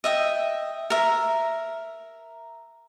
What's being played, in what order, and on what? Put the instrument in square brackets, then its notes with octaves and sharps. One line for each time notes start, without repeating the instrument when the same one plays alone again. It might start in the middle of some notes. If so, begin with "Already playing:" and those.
[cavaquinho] D#5 E5 G5
A#4 E5